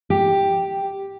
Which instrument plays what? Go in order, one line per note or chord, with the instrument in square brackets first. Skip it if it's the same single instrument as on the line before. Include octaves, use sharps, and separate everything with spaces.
[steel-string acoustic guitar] G4